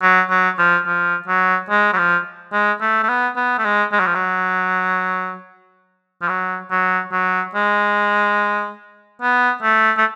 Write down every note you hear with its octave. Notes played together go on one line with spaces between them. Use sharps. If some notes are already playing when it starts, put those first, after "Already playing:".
F#3
F#3
F3
F3
F#3
G#3
F#3
F3
G#3
A3
A3
B3
B3
A3
G#3
G#3
F#3
F3
F#3
F3
F#3
F#3
F#3
G#3
B3
A3
A3